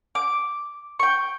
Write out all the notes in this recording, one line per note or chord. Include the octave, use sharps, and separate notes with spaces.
D6
G5 C#6